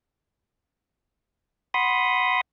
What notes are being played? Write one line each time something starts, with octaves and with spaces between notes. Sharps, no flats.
F#5 B5 C6 D#6